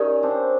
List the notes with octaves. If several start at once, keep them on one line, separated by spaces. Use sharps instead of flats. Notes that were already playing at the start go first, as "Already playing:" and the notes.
Already playing: C#4 D#4 G4 A#4 D5
C4 D4